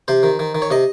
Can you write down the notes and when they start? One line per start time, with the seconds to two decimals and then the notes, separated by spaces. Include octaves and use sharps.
0.08 C3 C5
0.23 D#3
0.39 D#3
0.55 D#3
0.62 C#5
0.71 C3 D#5